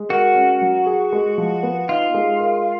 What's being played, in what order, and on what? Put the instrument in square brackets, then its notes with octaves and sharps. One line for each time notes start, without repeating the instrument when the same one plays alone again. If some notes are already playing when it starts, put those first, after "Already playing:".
Already playing: [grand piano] G#3
[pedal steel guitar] F#4 [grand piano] A#4
[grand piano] C#4
F#3
G#4
G#3
F3
B3
[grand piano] D#4 [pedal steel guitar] F4
[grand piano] G#3
A#4